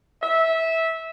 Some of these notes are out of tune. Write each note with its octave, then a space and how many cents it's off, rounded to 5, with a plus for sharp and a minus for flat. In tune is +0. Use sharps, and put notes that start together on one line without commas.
E5 -15